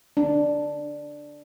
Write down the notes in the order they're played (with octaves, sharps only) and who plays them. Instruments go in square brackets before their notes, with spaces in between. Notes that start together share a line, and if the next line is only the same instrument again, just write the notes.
[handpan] D4